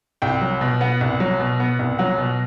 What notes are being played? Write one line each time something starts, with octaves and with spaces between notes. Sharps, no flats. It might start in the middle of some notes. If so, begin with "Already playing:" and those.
C2 G5
F#3
B2
B3 F#5
C2
F#3
B2
B3
C2
F#3 F#5
B2